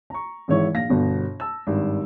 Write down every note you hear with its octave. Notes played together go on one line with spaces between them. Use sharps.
A#5 C#6
G#1 G#2 E3 E4 C#5 C#6
A#1 F5 A#6
G1 B2
A5 E6
G#1 G2